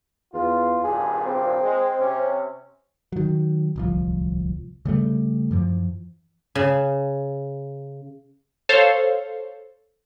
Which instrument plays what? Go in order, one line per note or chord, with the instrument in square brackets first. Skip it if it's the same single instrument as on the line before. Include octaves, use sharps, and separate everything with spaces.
[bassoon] E2 [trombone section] F4
[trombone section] G#1 G2 A#2 [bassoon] G#4
[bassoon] C4
[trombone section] G#3
C3 C#4
[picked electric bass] D#3 F#3
D1 C2 F3
C#3 G3 A3
F#2 E3 F3
[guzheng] C#3
[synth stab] A4 C5 C#5 F5